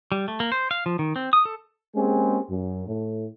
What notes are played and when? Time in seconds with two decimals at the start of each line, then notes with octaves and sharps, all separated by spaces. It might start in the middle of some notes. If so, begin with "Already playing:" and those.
0.12 G3
0.28 A3
0.40 A#3
0.52 C5
0.71 F5
0.86 F3
0.99 D#3
1.16 C4
1.33 D#6
1.45 A4
1.95 G#3 A#3 C4 C#4 G4 G#4
2.50 F#2
2.87 A2